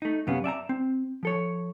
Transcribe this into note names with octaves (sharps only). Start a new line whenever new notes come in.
A3 D#4
F#2 C3 B3 C#4 F5
D5 E5 G#5 A#5
C4
F3 A4 C#5